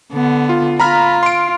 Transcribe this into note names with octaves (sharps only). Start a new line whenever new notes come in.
D3 B3
F4
F4 A#5 B5 F6
C6 D7